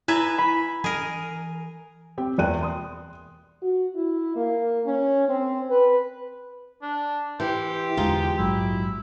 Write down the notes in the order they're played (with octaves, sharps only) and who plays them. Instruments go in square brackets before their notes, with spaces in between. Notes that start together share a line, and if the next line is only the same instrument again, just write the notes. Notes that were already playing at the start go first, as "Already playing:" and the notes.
[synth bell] E4 [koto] B4 E5 [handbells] G#5 A#5 [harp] G#6
[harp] B5
[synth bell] E3 [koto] G#4 A#4 [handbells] G#5
[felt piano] C4 G4 G5
E2 A#3 D5 G5 F#6 D#7
C6 D#6
[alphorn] F#4
E4
A#3
C#4
C4
B4
[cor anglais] D4
[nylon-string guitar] E3 [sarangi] G4 [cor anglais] C5
[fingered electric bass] E2 D3 [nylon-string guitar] G#3 D#4 F4
[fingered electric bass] A#1 G#2 F#3 [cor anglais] E4